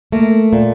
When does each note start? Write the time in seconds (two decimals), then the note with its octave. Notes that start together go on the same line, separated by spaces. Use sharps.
0.12 A3 A#3
0.53 A#2